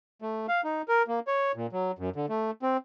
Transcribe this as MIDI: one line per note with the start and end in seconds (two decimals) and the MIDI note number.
0.22 0.46 57
0.48 0.61 77
0.64 0.82 63
0.88 1.02 70
1.08 1.19 58
1.27 1.52 73
1.56 1.67 46
1.73 1.92 54
1.99 2.10 42
2.16 2.26 50
2.29 2.51 57
2.62 2.77 60